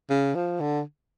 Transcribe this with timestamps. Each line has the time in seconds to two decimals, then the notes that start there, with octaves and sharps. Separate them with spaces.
0.10 C#3
0.35 F3
0.60 D3